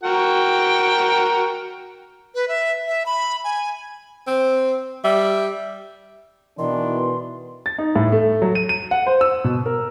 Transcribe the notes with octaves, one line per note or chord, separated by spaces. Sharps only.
F#4 A#4 G5
B4
E5
E5
B5
G#5
C4
G3 E5
B2 D#3 E3 D4 C6
A6
D#4
A2
A3
F#3
D#7
D#7
F#5
C5
E6
B2
A#4